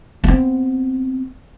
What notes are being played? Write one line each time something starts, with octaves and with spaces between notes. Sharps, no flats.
B3 C4